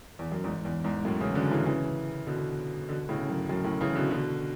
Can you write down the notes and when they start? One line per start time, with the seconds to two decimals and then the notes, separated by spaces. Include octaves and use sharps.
0.19 E2
0.32 F#2
0.44 E2 G#2
0.65 E2
0.84 E2 G#2
1.05 F#2 A2
1.21 C#3 E3
1.35 B2 D3
1.51 C#3 E3
1.66 C#3 E3
2.27 B2 D3
2.89 B2 D3
3.09 A2 C#3
3.29 F#2
3.49 F#2 A2
3.64 F#2 A2
3.80 C#3 E3
3.95 B2 D3
4.10 B2 D3